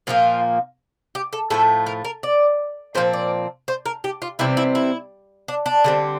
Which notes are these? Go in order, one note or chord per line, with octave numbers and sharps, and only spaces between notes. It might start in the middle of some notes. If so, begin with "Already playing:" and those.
A#2 F3 A#3 F4
G4
A4
A2 F3 A3 A4
A#4
A#4
D5
A#2 F3 C4 C5
D5
C5
A#4
G4
F4
C3 E3 G3 C4 E4
E4
E4
D4
D4
D3 G3 C4